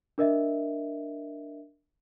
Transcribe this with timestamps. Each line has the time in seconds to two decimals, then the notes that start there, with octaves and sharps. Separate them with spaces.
0.18 D4 A#4 D#5 E5